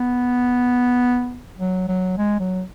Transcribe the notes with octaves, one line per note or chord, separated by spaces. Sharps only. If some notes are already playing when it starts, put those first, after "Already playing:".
Already playing: B3
F#3
F#3
G#3
F#3